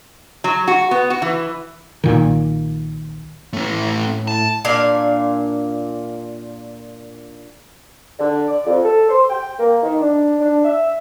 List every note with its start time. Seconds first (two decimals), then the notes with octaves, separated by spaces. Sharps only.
0.44 F#3
0.67 F#4
0.91 B3
1.10 F#4
1.22 E3
2.04 B1 A#2 D#3
3.53 A2 A3 C#4
4.28 A5
4.65 A#2 D4 F5 G#5
8.19 D3
8.48 D5
8.65 F2
8.83 A4
9.09 C5
9.30 G5
9.58 A#3
9.82 D#3
10.00 D4
10.40 D4
10.65 E5